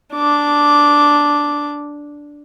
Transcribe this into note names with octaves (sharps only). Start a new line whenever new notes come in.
D4 D6